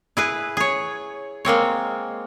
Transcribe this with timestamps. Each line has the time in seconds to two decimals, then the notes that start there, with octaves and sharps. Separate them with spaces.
0.17 E4 G#4 B4
0.57 G#4 C#5
1.45 G#3 A#3 C4 C#5